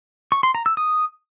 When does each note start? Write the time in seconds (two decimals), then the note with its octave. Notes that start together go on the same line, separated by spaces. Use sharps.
0.32 C#6
0.43 C6
0.55 A#5
0.66 E6
0.77 D#6